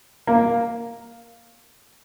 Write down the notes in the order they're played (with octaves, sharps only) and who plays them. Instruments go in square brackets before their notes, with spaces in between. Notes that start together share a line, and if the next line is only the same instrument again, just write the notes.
[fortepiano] A#3